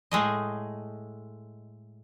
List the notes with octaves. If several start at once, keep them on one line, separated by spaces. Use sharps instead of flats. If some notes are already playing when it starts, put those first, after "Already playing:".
A2 G#3 A3 D#5